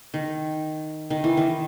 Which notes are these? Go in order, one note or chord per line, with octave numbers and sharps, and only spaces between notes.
D#3
D#3
E3
D#3